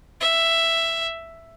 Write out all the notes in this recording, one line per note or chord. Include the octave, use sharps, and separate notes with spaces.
E5